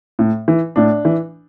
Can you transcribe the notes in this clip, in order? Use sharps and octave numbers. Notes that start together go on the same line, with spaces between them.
A2
E3
A2 D4
E3